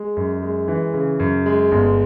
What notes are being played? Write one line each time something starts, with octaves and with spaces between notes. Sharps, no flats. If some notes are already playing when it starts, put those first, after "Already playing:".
Already playing: G#3
F#2
G#3
E3
C#3
F#2
G#3
G1